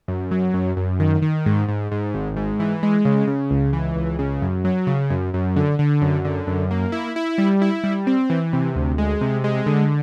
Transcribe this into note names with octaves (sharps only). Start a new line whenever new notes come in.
F#2
F#3
F#2
F#2
D#3
D#3
G#2
G#2
G#2
G#1
G#2
E3
G#3
C#3
C#3
C#2
E3
C#2
C#3
F#2
F#3
C#3
F#2
F#2
D3
D3
F#2
D3
F#2
A#3
E4
E4
G3
E4
G3
C4
E3
C3
D2
G#3
C3
G#3
D3